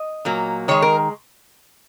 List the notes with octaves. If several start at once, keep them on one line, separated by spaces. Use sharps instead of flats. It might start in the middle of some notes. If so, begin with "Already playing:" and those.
Already playing: D#5
A#2 F#3 A#3
D#3 G#3 C#5
A#4